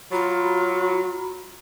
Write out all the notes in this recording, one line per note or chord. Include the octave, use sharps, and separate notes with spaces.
F#3 F4 F#4 A#5 B5